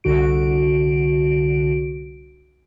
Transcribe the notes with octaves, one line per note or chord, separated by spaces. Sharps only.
C2 D3 F#4 D7